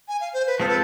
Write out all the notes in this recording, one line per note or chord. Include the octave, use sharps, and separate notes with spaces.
G#5
F5
C5
B4
F3 G#3 C4 F4 A4 C5
B4